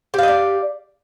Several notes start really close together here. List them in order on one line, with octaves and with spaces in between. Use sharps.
G4 F5 D#5 D5